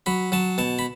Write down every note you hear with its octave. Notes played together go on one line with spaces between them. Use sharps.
F#3 B5
F#3 A5
B2 A5
B5